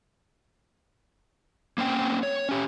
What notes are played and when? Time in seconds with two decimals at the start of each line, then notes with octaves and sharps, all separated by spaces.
1.78 A#3 C4 C#4 G5
2.23 C#5
2.49 C#4 G4